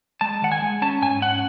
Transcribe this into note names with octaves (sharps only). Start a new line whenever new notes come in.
G#3 A5
D#3 F#5
G#5
G#3
C#4 A5
G#2 G#5
C#4 F#5